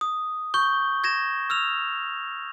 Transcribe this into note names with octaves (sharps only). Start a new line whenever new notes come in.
D#6
C#6 G6 G7
G#6 A#6 E7
E6 F6 F7